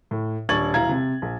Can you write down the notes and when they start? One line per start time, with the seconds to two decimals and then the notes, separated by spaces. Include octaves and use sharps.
0.11 A2
0.49 D#1 D4 C#6 G#6 A6 F#7
0.74 E1 E4 F5 A#5 G#6
0.89 C3
1.22 A#1